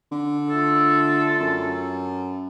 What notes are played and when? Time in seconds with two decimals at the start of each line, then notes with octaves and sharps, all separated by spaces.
0.12 D3
0.49 A3 F4 A4
1.40 F#2